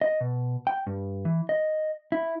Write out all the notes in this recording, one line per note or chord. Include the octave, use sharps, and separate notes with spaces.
D#5
B2
G5
G2
E3
D#5
E4